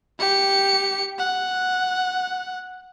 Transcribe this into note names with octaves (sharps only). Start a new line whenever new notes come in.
G4 C#7
F#5